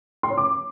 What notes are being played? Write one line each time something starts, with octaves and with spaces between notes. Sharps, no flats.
C6
C#5
D6